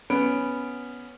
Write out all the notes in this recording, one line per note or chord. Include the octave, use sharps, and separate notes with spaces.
B3 C#4 D7